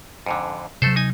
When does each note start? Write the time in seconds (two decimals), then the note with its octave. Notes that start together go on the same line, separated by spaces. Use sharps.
0.26 F2 G#2 D3
0.82 C3 F#3 A3 A4 C5
0.96 D#4 G#5